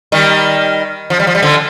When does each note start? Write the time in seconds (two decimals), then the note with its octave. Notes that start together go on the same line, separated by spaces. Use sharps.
0.12 D#3 G3
1.10 F3
1.20 G3
1.27 F3
1.35 G3
1.43 D3 F3